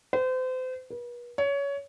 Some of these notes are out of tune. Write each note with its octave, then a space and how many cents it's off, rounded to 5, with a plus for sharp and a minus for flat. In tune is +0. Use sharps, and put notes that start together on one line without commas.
C5 -35
B4 -40
C#5 +20